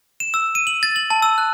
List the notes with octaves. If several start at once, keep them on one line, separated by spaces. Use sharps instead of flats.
E7
E6
D#7
F#7
A6
F#7
A5
E6
F#6